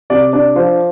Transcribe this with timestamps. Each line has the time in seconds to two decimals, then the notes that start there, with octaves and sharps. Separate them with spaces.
0.10 C3 D5
0.33 D4 D5
0.56 F3 C5